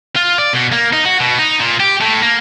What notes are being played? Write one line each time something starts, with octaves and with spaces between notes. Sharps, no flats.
F4
D5
B2
A#3
D#4
F#4
B2
D#4
A#2
G4
A2
A#3